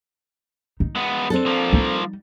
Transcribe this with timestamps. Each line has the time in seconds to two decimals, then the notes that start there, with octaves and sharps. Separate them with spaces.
0.80 D#4
0.96 G#3 B3
1.30 C4 D4 A4
1.46 F3 A#3
1.73 G3 D#4